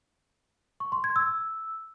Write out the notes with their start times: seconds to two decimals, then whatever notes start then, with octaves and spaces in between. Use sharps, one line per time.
0.80 C#6
0.92 C6
1.04 G#6
1.16 E6